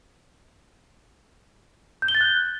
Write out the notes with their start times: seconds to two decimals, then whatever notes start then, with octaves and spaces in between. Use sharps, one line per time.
2.02 G6
2.08 G7
2.15 A6
2.21 F#6